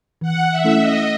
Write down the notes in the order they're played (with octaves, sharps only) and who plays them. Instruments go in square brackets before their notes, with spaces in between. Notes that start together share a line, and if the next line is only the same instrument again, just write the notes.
[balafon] E3 [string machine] F#5
[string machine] E5
[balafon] A3 C#4 E4 A4
[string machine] D#5